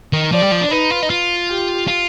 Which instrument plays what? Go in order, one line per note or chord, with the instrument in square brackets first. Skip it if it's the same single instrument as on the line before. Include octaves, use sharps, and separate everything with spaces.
[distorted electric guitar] D#3
[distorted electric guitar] F3 [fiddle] D5
[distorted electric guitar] G3
F3
D4
[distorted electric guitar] D#4 [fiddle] B4
[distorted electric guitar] F4
D#4
F4
[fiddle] G4
[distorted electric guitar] F4